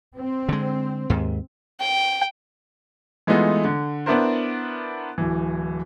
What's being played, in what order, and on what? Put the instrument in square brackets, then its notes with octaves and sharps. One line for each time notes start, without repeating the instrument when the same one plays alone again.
[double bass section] C4
[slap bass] D3 G#3
D#2 G#2
[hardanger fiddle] G5
[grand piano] E3 G#3 A3 B3 D#4 F4
D3
B3 D4 E4 A#4 C5
D1 E3